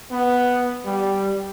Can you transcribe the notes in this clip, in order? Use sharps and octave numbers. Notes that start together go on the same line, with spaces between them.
B3
G3